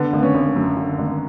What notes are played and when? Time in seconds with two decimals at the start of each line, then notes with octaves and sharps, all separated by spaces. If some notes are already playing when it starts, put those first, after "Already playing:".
Already playing: D3 B3
0.13 G#1
0.19 B3
0.23 C#4
0.34 G#1
0.56 F#2
0.77 D3
0.99 G#1